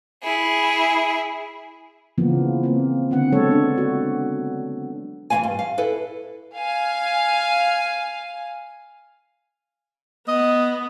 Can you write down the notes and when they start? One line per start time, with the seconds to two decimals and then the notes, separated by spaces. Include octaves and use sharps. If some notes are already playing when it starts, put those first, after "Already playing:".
0.23 E4 G#4
2.18 C#3 E3 F3 A#3 B3
2.63 A#3 C4
3.11 D3 B3 C4 F#5
3.32 F#3 G#3 A4 C#5
3.48 B3 D4
3.78 F#4
5.30 E2 E3 G#3 B3 F5 G#5
5.43 G2
5.59 F5
5.78 E4 A4 B4
6.55 F5 G#5
10.28 B3 D#5